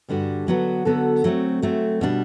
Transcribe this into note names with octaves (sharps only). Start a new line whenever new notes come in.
G2 D3 G3 D4 F#4
D3 F#3 B3 F#4 A4
D3 F#3 B3 F#4 A4
F#3 A3 C4
F#3 A3 C4
B2 G3 D4